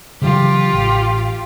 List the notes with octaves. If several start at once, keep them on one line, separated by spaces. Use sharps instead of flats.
C#3 E3 F#3 F4 G4
A1